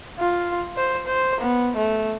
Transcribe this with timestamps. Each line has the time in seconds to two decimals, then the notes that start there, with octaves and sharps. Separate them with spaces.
0.18 F4
0.77 C5
1.06 C5
1.40 B3
1.77 A3